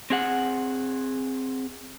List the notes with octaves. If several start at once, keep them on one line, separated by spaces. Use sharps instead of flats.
C4 G#4 F#5